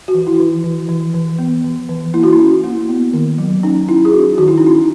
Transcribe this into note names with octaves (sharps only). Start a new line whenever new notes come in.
F#4
E3
E4
E3
E3
E3
E3
B3
E3
E3
A#3 E4
F#4
E4
C#4
A#3
B3
D#3
F#3
C#4 D#4
C#4 E4
G#4
C#4 F#4
D#3 F#4
E4
D#4
C#4 E4